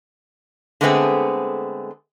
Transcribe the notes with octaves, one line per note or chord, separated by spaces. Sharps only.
D3 G#3 A3 B3 C4 G#4